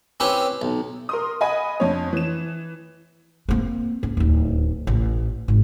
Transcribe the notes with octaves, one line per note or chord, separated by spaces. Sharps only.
C4 C#4 E4 G4 B4
B1
A#4 C6 D#6
D#5 F#5 G#5 B5
F2 D4 C#5
E3 E7
A#3 C4
C#4
D1 D#2
A1
G#1